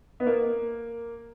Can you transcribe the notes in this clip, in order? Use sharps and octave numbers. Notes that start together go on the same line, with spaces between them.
B3
A#3